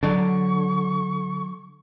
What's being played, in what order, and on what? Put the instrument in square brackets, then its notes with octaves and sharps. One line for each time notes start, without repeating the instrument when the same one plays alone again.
[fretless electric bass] D3 [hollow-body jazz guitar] F#3 D5 A5 [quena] C#6